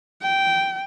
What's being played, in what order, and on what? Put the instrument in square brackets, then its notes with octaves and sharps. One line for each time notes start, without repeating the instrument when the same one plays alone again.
[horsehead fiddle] G5